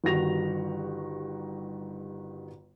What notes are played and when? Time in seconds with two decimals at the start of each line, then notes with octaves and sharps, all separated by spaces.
0.04 G1 G2 D#3 F#4 A#6 F7